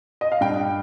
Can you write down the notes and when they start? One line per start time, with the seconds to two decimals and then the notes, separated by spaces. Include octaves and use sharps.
0.21 D#5
0.32 F5
0.41 G2 G5